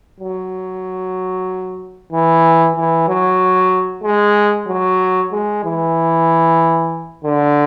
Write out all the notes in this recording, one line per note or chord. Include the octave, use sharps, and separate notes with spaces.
F#3
E3
E3
F#3
G#3
F#3
G#3
E3
D3